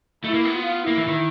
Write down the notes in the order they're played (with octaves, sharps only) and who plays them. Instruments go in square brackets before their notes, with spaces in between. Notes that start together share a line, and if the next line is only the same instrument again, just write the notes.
[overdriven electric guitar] A3 [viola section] E4
[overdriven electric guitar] A#3
B3
[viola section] F4
[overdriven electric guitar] A#3 [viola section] E4
[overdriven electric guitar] E3
D#3